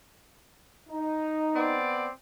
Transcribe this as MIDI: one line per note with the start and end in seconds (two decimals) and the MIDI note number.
0.89 1.78 63
1.54 2.09 59
1.54 2.09 60
1.54 2.09 74